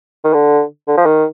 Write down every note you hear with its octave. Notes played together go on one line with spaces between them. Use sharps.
D#3
D3
D3
F3
D#3